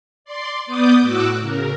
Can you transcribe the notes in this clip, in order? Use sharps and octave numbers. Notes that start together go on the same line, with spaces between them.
D5 C6
B3 D5 D6 D#6 G6
A2 F#4 D6 E6 F#6
C#3 A#4